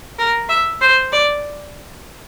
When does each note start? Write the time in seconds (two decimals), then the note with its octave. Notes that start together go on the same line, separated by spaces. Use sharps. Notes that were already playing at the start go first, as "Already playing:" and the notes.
0.19 A#4
0.49 E5
0.82 C5
1.12 D5